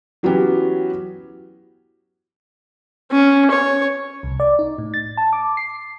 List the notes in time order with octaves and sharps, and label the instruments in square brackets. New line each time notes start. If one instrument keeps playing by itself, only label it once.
[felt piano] E3 F#3 B3 C#4 G4
[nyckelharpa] C#4
C#5
[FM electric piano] C2
D5
D#4
A2
A6
A5
D6
C7